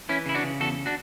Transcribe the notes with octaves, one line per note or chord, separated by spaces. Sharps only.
E3 C#4 E4
C#3 E4
D4 F#4
C#3
E2 F#4 A4
D4 F#4